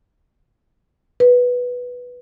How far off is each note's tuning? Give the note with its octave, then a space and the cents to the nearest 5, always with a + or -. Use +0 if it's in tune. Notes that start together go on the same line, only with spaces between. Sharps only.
B4 -5